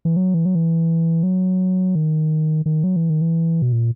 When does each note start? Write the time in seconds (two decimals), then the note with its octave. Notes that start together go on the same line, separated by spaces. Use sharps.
0.05 E3
0.16 F#3
0.34 E3
0.45 F#3
0.55 E3
1.23 F#3
1.95 D#3
2.66 D#3
2.84 F#3
2.96 E3
3.10 D#3
3.21 E3
3.62 B2
3.72 A#2